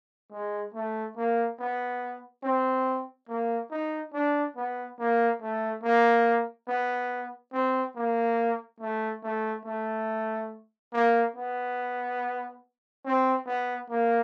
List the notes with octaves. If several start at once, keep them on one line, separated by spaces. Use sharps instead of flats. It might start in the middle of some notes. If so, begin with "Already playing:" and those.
G#3
A3
A#3
B3
C4
A#3
D#4
D4
B3
A#3
A3
A#3
B3
C4
A#3
A3
A3
A3
A#3
B3
C4
B3
A#3